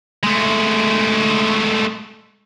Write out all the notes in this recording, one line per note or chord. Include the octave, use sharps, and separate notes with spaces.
G#3 A3